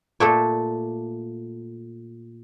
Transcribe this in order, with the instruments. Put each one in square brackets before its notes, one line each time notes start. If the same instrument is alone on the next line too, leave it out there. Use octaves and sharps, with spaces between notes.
[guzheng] A#2 A3 A4